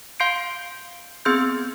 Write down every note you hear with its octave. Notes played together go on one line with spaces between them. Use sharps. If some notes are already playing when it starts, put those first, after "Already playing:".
F5 C6 G6 C7 D7
B3 C4 G#4 C6 E6 G6